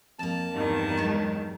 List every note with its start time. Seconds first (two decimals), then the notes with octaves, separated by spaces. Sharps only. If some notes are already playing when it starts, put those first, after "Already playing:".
0.19 F2 A#3 A5
0.52 E2 G2 D#3
0.98 F#3 G#3